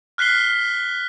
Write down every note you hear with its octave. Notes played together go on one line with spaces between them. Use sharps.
F6 F#6 B6 C7 G7